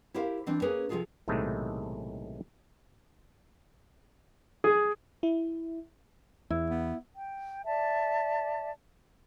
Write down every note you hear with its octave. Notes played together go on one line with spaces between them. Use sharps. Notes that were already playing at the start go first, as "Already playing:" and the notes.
E4 G4 A#4 C5 E5 F5
E3 C4 D4
A#3 C#4 G#4 A#4 B4
C3 F3 F#3 F4 G#4 A4
B1 A2 C3 D#3 G#3 A3
G#4
E4
E2 E4
B3
G5
D5 E5 A5